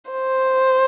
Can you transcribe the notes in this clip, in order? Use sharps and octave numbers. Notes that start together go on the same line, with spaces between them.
C5